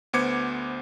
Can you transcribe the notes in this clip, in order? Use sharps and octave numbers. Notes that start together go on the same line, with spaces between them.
D2 B3 C5 D6 G#6 C#7